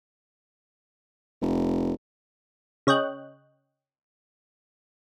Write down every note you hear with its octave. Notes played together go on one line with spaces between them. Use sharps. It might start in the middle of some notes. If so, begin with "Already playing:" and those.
F1
C#3 C#5 D#5 G5 F#6